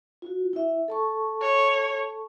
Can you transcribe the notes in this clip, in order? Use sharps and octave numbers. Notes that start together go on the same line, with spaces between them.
F4 F#4
E4 E5
A4 A5 C#6
C#5